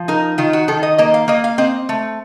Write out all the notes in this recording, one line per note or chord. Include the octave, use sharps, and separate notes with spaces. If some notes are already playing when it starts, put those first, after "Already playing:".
Already playing: F3
D#4 A#4
D#3 F4
F#4
D#3 A4
D#5
A#3 D#5
F5
A#3 D#5
F5
C4 D#5
A3